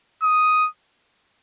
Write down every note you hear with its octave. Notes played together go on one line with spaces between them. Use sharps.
D#6